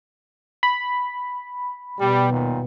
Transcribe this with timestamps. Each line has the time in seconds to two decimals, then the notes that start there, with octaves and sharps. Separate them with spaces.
0.63 B5
2.00 B2 G3 B3
2.31 D#2 A#2 G3